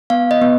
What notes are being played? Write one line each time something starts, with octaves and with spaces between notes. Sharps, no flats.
B3 F5
D#5
B3